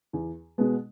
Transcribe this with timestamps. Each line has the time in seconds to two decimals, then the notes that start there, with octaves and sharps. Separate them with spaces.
0.13 E2
0.58 B2 G#3 B3